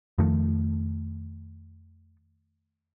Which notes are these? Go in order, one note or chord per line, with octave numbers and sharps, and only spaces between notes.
F2 D#3 F3 A3